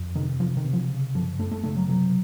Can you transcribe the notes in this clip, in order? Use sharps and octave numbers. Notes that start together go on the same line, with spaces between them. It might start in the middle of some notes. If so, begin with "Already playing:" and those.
Already playing: F2
C3 D#3
C3 F3
D#3
C3
F3
C#3
F#2 F3
F#2 A3
A3
C#3 A3
F#3
C3 F#3